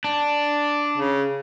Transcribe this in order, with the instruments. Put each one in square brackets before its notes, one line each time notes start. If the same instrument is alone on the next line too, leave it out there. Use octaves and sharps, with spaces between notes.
[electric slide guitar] D4
[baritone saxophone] C#3